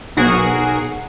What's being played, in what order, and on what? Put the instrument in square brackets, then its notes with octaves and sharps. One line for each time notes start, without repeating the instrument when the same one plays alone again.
[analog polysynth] B1 F#4 G#4 A#4 C7